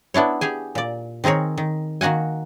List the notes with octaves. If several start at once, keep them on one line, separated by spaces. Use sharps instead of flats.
B3 D4 E4 C#5
G4 G#4 G#5
A#2 D5
D#3 C4 G#4 A#4 C#5
D#3
D#3 A#3 F#4 F#5 G#5